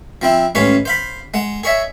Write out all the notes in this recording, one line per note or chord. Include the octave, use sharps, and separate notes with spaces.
F3 C4 E4
A1 G#3 C#4 B4 C#5 F5
C5 F5 B5
G#3 F#5
G#4 C#5 D#5 E5